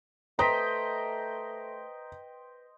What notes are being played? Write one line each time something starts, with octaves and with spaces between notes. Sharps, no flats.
A3 B4 C5 D#5 G5 A#5 B6